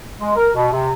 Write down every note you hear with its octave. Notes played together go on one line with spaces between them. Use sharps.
G#3
A#4
B2
C3